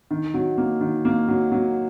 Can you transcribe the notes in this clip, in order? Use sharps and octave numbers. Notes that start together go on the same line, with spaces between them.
D#3
F#3
A#3
D#3
A#3
F#3
F#3